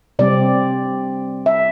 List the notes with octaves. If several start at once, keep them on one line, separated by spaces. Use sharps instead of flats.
C3 G3 C4 D5
E5